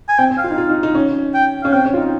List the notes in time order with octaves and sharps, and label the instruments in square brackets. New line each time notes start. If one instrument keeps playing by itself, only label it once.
[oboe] G#5
[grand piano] C4 [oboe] G5
[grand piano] C4
[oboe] F5
[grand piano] F4
D#4
F4
D#4
D#4
C#4
[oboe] G5
[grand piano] C#4 [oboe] F5
[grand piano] C4 [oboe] G5
[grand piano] C#4
F4
D#4